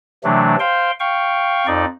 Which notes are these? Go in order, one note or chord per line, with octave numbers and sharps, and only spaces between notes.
C3 E3 F#3 A3 D4
C5 F5 G5 C6
F5 G5 C#6
F2 D#4 D5